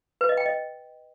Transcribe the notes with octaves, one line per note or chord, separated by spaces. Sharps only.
B4
D#5
G5
D#5